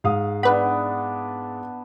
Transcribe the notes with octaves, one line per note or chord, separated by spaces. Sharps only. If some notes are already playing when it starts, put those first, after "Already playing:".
G#2 F5 D#6
B3 D4 E4 B4 F#5 B5